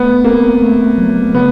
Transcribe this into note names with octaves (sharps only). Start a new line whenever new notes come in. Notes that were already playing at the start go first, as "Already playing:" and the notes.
Already playing: A3 B3
A#3 C4
A3
F#3
C#3 B3